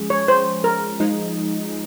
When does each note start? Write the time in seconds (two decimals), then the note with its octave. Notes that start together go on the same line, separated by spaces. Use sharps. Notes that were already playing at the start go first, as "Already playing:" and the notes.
Already playing: F3 G#3 C#4 G#4
0.10 C#5
0.28 C5
0.64 A#4
1.00 F3 G#3 D#4